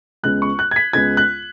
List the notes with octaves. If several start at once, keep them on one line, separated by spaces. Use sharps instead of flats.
C#2 C#3 G#3 B3 F#6
C#6
F#6
G#6
B6
C#2 C#3 G#3 B3 G#6
F#6